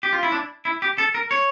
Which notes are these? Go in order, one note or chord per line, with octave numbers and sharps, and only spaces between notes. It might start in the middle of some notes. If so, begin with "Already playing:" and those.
G4
F4
E4
D4
E4
G4
A4
A#4
C#5